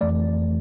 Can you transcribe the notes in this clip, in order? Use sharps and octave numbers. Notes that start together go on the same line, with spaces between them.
F2 E3 A3 D5